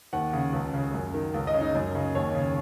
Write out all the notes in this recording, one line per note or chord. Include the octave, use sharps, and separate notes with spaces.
D#2 F#5
C#3
C#2
C#3
F#2
D#3
C#2
D#5
C#3
D#4
F#2
C#3
D#2 C#5
C#3